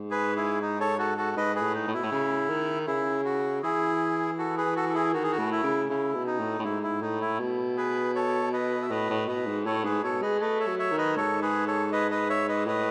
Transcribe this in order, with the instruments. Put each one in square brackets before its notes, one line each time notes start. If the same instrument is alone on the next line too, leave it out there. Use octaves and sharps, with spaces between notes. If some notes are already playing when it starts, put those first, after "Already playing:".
Already playing: [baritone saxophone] G#2
[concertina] G#4 B4
E4 G#4
D#4
A4 C#5
F#4 A4
F#4 A4
[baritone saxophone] G#2 [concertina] B4 D#5
[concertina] G#4 B4
[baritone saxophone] A2
[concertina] D#4
[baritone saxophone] A2
[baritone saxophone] B2 [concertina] E4
[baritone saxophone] A2
C#3
D#3
[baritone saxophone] C#3 [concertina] E4
[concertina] F#4
[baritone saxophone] E3 [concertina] E4 G#4
[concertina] F#4 A4
G#4 B4
F#4 A4
A4
E4 G#4
[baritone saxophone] D#3 [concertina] F#4
[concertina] G#4
F#4
[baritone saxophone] A2
[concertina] E4
[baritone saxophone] C#3
[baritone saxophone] C#3 [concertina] E4
[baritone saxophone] B2
[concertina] D#4
[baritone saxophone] A2
A2
[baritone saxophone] G#2 [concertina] E4
[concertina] E4
[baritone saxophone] A2 [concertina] D#4
[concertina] E4
[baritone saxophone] B2
[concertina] G#4 B4
A4 C#5
B4 D#5
E5
[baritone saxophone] A2 [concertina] B4 D#5
[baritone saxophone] A2
[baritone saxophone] B2 [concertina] B4 D#5
[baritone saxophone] G#2
[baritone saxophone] A2 [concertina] A4 C#5
[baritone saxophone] G#2 [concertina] G#4 B4
[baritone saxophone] B2 [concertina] A4 C#5
[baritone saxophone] G#3 [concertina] B4 D#5
[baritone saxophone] A3 [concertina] B4 D#5
[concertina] C#5 E5
[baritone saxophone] F#3
[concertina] C#5 E5
[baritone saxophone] D#3
[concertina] B4 D#5
[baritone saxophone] G#2 [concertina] A4 C#5
[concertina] G#4 B4
A4 C#5
B4 D#5
B4 D#5
C#5 E5
B4 D#5
[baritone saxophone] A2 [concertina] B4 D#5